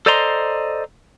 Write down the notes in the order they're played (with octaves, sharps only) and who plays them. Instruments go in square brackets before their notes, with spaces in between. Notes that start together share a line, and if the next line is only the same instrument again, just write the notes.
[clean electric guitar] A4 C5 D5 D#5 A#5 C6